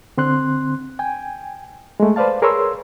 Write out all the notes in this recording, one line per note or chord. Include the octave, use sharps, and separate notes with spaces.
D3 C4 C6 F#6
G5 G#5
G#3 A3
B4 C5 D5 F5 A5
G#4 A#4 B4 C#5 C6 E6